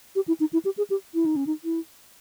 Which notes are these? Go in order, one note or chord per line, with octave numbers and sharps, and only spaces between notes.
G4
E4
D#4
E4
G4
G#4
G4
E4
D#4
C#4
D#4
E4